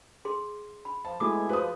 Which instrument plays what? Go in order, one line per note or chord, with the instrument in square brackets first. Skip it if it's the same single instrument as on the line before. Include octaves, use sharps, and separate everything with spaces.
[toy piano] G#4 C6 D6
B5
[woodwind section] F3 [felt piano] A5
[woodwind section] B2 G#5 [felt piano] G#3 A3 E4 [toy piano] F#4 D#6 [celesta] D6
[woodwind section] F3 [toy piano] F#4 G#4 [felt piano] B4 D#6